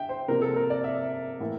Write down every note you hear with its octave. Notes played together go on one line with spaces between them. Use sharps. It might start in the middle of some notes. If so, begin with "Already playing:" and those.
Already playing: D3 E5 G5
C5
C3 F3 A#3 D4 A#4
A4
A#4
D5
E5
A2 E3 A#3 E4